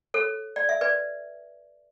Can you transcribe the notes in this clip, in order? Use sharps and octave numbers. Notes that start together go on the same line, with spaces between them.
A4 C#5
D5
E5
B4 D5